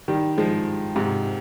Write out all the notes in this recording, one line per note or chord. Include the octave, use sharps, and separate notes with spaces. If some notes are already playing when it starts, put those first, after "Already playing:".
D#3 G3
F3 G#3
G#2 C3